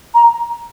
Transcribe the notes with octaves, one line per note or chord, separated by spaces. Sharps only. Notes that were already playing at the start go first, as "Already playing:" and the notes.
A#5